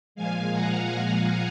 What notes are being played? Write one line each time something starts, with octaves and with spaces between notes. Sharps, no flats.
A#2 F3 G#3 F5 G#5
F#5 A#5